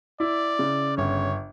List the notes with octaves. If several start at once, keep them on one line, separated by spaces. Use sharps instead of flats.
E4 D5
C#3
G1 C#5